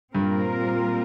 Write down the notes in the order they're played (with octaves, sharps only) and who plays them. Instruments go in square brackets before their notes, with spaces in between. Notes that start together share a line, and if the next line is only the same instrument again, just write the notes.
[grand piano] G2 [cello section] A#2 G3 C4 F4 A#4